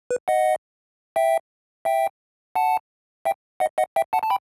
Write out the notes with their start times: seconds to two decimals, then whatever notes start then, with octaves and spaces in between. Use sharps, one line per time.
0.11 B4
0.28 D#5 F#5
1.16 E5 G5
1.85 E5 G5
2.55 F#5 A5
3.25 E5 G5
3.60 D#5 F#5
3.78 D#5 F#5
3.96 E5 G5
4.13 F#5 A5
4.23 A5
4.30 G5 B5